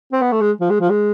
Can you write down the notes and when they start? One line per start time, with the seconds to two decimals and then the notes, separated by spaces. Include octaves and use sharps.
0.12 C4
0.22 B3
0.32 A3
0.41 G#3
0.60 F3
0.70 G#3
0.80 F3
0.90 G#3